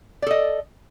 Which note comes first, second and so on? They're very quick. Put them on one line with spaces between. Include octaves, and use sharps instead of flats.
D5 A4 D#5